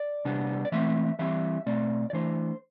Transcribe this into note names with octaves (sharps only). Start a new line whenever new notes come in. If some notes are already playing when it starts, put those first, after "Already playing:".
Already playing: D5
C3 G3 B3 D4
D5
E3 A3 C4 E5
E3 G3 C4 E5
B2 A3 C4 D5
D5
E3 A3 D4 C5